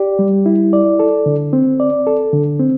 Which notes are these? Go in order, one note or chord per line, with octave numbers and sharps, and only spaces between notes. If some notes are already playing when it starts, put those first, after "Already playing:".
Already playing: G4 D5
G3
E4
D5
A4
D3
C4
D5
A4
D3
C4